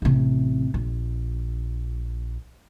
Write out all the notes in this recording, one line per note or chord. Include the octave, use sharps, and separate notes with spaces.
A1 C3
A#1